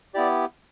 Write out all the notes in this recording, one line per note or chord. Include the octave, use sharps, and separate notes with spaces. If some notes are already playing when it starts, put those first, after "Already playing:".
B3 E4 G4 D5